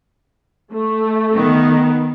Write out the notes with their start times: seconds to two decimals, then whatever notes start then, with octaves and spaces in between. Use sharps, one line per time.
0.72 A3
1.34 D#3 B3